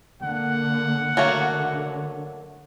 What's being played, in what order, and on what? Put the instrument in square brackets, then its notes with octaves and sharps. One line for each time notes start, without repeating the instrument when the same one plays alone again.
[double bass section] D3 A#3 [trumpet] F#5
[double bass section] D3 [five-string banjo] F#3 A3 A#3